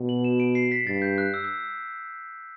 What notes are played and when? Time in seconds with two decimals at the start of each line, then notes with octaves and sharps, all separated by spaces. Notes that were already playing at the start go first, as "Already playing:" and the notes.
Already playing: B2
0.09 F#7
0.24 E7
0.40 D7
0.55 C7
0.72 B6
0.87 G2 A6
1.02 G6
1.18 F#6
1.34 E6
1.44 E6